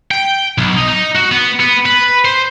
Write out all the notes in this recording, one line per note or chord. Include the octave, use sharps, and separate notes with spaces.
G5
B1
D#4
D#4
F#4
B3
B3
B4
C5